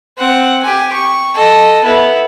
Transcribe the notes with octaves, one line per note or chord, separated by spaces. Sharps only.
C4 F#5
G4 G#5
C#6
A4 D#5
B3 E4